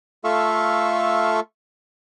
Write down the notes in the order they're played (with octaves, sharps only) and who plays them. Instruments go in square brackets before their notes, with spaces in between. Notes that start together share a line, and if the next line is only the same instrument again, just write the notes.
[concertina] A3 F4 A4 E5 F5 C#6